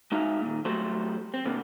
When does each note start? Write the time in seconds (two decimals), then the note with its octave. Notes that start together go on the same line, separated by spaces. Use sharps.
0.12 G#3 D#4 F#4 E5 F5
0.42 A#2 D#3
0.65 F#3 G3 A3 C5
1.34 C4
1.45 C3 A#3 B3 D4